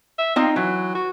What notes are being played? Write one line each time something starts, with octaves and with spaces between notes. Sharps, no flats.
E5
C4 D#4 F4 G5
E3 F#3
F#4